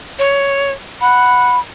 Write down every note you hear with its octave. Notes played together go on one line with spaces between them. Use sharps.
C#5
F#5 B5